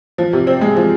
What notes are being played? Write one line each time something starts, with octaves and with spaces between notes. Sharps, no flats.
F3
C3
C4
G#3
F3